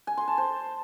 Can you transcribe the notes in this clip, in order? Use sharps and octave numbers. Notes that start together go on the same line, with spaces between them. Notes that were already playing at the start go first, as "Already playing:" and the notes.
G#5
C6
A5
C5